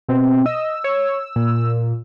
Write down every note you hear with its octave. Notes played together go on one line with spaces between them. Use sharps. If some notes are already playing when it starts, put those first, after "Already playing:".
B2 C4
D#5 E6
C#5
A#2